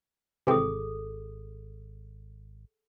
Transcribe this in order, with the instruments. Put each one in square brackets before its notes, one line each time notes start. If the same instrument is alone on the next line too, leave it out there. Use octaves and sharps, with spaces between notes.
[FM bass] G#1 [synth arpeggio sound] C3 E3 C4 [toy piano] G#4 A4 D#6